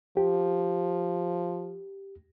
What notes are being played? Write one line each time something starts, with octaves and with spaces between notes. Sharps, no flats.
F3 G4